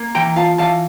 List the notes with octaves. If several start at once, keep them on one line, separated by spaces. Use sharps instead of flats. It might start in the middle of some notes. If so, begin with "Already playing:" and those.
Already playing: A#3
E3 G5 A#5
F4 F5 A5
E3 F5 A5